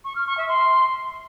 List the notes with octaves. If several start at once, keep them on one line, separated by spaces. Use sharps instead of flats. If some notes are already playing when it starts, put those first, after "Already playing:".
C#6
F6
C#6
E5
C6